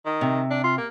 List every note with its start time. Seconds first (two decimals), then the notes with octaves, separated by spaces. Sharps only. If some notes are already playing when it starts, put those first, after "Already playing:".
0.06 D#3
0.21 C3
0.50 D4
0.63 F4
0.77 A#3